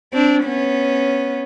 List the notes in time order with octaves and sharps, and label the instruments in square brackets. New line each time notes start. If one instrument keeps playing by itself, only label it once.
[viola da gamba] C4 D4
B3 C#4